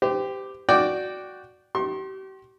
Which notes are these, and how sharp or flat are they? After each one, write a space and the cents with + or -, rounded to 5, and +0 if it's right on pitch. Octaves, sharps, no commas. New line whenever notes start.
G4 +0 C5 -40
F#4 +0 D5 +0 G5 -10
G4 -40 C6 +35